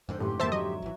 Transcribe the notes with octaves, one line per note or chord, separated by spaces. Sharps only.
F2 G#2 D3 C5
F#2 A2 G4 B4 C6
A2 A#3 C5 E5 A5
F#3 D#5 E5
G#1 E3 F#4